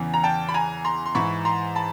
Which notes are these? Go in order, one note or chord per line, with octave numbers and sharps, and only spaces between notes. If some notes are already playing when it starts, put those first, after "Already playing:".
Already playing: E2 C#3 E3
A#5
G5 A5
B5
G#5 A#5
A#5 C6
C6
G#2 E3 B5 C#6
A#5 C6
A5 B5